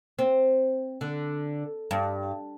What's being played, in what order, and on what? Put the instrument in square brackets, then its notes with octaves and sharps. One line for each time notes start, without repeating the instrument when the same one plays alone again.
[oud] C4
D3
G2